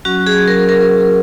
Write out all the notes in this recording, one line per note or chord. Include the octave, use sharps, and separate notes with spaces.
F#3 C#4 F#4
G#4
A#4
A#4